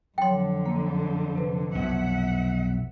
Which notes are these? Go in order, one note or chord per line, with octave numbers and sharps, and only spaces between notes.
F2 D3 F#3 C#5 G5 C6
A#3
C3 B4
B1 F2 E5 F#5